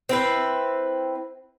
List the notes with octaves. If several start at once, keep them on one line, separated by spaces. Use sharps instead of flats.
C4 E4 B4